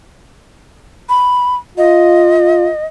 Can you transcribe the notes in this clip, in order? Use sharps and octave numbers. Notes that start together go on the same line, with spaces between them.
B5
F4 D#5